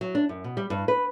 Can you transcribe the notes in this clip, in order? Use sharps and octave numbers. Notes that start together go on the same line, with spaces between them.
F#3
D4
F#2
B2
G3
G2
B4